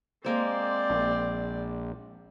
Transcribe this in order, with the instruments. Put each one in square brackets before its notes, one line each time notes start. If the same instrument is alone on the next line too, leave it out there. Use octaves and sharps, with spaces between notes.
[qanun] G#3 A#3 C5 [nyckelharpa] C4 D5
[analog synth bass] A#1